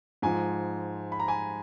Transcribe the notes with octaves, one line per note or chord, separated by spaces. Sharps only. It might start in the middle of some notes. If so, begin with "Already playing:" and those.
G#2 F3 G#5
B5
A#5
G#5